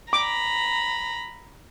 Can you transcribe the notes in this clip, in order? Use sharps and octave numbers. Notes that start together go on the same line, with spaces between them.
A#5 B5 D6